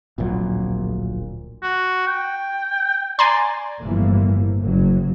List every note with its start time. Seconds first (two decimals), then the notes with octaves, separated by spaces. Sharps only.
0.18 D1 A#1 A#2 F#3
1.62 F#4
2.07 G5
3.19 D5 G#5 A#5 C6
3.81 G1 A2 E3 F3 A#3
4.60 F#1 F#3